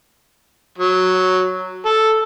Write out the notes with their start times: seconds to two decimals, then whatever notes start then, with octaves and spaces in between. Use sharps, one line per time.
0.78 F#3
1.85 A4